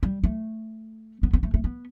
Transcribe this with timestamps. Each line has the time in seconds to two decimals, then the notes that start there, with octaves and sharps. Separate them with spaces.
0.03 G3
0.24 A3
1.23 B3
1.33 B3
1.43 A3
1.54 A3
1.64 B3